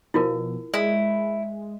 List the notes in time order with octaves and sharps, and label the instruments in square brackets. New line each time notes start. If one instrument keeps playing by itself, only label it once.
[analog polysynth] B2 F3 [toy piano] E4 F4 A#4
[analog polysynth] G#3 [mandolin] E4 [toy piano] D5